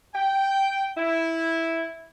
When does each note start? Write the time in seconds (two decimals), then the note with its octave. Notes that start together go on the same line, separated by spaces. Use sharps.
0.15 G5
0.96 E4